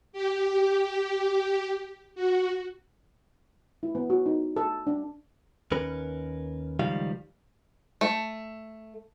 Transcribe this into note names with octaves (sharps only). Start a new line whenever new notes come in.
G4
F#4
E4
B3
F#4
D#4
A4
D4
D#2 C#4 A#4 B4
C#2 D#3 F3 G3 F5
A3